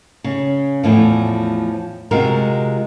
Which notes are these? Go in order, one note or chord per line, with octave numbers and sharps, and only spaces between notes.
C#3
E2 A2 F3
C3 G#3 F4 F#4 A#4